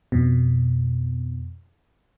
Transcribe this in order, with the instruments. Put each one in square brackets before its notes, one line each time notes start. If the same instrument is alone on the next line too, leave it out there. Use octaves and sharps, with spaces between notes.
[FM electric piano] F2 B2